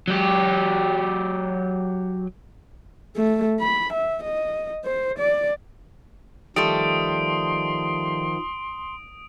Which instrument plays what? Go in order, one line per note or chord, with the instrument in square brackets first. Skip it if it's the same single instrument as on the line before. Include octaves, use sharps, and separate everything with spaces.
[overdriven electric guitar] F#3 G4
[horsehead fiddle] A3
B5
E5
D#5
C5
D5
[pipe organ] D#3 F3 [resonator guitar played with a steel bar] G3 A3 [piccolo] C6 [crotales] D#6 D7